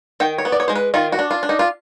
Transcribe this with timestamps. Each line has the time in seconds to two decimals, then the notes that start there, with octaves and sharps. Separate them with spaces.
0.20 D#3 G5
0.38 C#5
0.45 B3
0.52 D5
0.60 C#5
0.68 G#3 C5
0.76 B4
0.94 D#3 F4
1.12 F#4
1.19 D4
1.31 F4
1.43 D4
1.49 D#4
1.59 F4